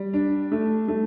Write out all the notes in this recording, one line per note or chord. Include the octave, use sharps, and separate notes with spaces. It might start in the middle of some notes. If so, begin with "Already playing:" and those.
Already playing: G3
D4
A3
A3